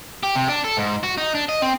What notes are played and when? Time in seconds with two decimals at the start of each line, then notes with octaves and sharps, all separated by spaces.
0.23 G4
0.36 C3
0.49 D4
0.64 A4
0.77 G#2
1.03 F#4
1.18 D#4
1.35 D4
1.49 D#5
1.62 C4